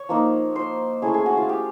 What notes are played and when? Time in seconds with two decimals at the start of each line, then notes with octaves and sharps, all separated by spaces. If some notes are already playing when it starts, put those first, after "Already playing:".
Already playing: C#5 C#6
0.09 F3 A#3 D#4
0.55 C5 C6
1.02 A3 C#4 E4 G#4 G#5
1.14 G#4 G#5
1.26 F#4 F#5
1.37 F4 F5
1.49 G4 G5